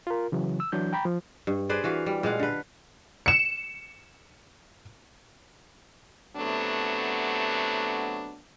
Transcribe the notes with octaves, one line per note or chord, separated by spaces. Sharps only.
F4 A#4
C#3 E3 F#3
E6
E3 F#3 D4 G6
G5 A#5 B5
F3
G2
G#4 B4 C5 D5
E3 F#4 F5
G3
A#2 G#3 F5 F#5
D3 B4
C#7 E7
C3 F#3 A3 B3 D4